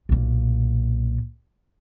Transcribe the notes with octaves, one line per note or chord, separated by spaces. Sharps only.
B1 A#2